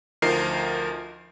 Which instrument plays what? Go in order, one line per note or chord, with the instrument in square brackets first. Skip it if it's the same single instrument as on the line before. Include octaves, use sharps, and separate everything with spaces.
[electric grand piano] D2 F3 D#4 A#4 C7